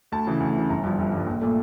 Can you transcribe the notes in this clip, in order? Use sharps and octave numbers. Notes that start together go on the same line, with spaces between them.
D2 A5
C#3 E3
D2
C#3 E3
G1 A#5
G2 F3
G1
G2 F3
A#1
A#2 A3